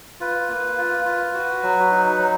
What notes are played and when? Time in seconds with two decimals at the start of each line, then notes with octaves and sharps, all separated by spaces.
0.20 F4 B4
0.49 A#3
0.78 F4
1.05 F4
1.34 F#4
1.63 F#3
1.91 D#4
2.19 F#3